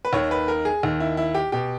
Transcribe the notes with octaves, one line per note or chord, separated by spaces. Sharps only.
B4
D#2 D#3 C#5
B4
A#4
G#4
D#2 D#3
E4
E4
G4
B2 G4